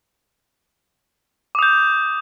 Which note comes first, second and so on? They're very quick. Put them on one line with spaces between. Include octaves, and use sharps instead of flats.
D6 D#6 G6